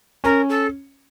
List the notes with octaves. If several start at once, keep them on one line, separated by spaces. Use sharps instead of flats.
C#4 A#4
A4